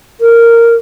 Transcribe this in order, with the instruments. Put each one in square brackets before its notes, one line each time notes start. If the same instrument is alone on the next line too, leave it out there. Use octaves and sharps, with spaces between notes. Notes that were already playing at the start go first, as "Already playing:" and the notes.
[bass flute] A#4